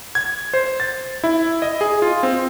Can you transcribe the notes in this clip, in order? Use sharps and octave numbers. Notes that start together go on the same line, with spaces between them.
G#6
C5
A6
E4
D#5
G#4
F4
C4